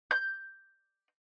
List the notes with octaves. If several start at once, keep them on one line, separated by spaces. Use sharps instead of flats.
G6